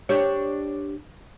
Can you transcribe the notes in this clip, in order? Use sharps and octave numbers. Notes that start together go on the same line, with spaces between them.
D4 G4 C#5